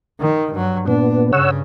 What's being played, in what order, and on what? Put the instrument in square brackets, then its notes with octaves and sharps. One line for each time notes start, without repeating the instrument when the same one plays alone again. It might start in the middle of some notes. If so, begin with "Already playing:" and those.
[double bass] D#3
G2 F#3
[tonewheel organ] A#2 B3 [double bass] D4
[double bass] G2 C#3 [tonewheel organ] C#5 F#5 E6